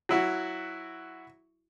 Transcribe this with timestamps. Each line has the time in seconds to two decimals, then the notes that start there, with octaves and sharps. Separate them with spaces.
0.09 F#3 E4 F#4